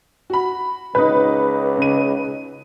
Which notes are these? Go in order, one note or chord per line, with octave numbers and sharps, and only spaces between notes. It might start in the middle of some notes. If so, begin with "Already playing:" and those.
F#4 B5
C#2 D#4 B4
C#3 D#7